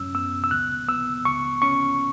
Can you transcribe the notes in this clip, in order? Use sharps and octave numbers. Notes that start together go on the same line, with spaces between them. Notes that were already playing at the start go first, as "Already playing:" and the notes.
Already playing: F#2 C#4 E6
B3 E6
E6
C#2 F#6
B3 E6
C#2 C#6
C#4 C#6